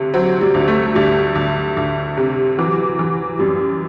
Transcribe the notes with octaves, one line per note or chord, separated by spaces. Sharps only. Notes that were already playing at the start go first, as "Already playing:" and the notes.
Already playing: D2 C3
F#3 C4
G3
D2
A3
D2 G3
D2
D2
C3
E3 F#3
E3
F#2 G3